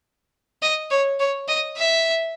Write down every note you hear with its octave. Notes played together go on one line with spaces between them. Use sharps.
D#5
C#5
C#5
D#5
E5